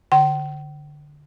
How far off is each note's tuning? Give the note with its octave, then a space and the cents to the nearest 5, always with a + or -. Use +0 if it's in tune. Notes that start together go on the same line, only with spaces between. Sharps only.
D3 +0 G5 -40